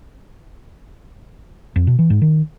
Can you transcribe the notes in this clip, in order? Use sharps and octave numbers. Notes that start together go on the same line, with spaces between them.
F2
B2
E3
G#2
D#3